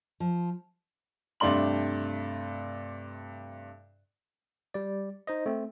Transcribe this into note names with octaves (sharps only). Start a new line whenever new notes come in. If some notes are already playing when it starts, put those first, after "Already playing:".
F3
G2 C3 A3 D4 C6 F#7
G3 D5
D#4 C5 D#5
A3 C4